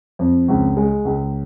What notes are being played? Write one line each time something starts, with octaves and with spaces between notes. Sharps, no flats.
F2
C#2
G#3
C#2